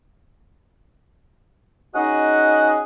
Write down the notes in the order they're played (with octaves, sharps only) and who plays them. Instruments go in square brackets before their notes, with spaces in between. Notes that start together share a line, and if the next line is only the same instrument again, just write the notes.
[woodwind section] C#4 D#4 F#4 G#4 D#5 F#5